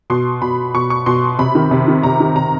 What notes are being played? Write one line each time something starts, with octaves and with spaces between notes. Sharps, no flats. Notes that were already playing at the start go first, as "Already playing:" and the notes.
B2 C6
B2 B5
B2 C#6
C#6
B2 C6
C3 B5
D#3
C3
D#3
C3 A#5
D#3
C3 A#5